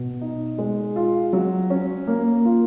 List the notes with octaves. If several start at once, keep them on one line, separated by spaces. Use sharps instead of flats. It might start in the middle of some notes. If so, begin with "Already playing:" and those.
Already playing: B2
D#4
G#3
F4
F#3
C#4
A#3
F4